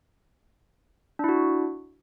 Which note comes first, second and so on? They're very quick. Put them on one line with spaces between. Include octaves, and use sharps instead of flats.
D4 E4 F#4